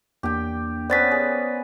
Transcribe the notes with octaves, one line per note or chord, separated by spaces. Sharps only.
E2 A#3 D4 G4 G5
B3 C#4 B4 C5 D5 A6 B6
G#4